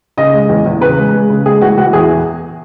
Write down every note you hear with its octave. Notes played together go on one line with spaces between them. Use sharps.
C#3 D#5
G#3
E2
E2
C#3 B4
G#3
G#3
C#3
G#3 G#4
E3 F#4
E3 F#4
E2 G#4